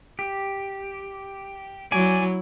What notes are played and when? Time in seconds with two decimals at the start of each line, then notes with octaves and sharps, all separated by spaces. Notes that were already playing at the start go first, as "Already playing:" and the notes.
0.19 G4
1.92 F#3 E4 D5 G#5